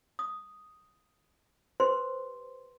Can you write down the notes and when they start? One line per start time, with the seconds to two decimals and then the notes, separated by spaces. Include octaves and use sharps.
0.19 D#6
1.80 G4 B4 C5 C6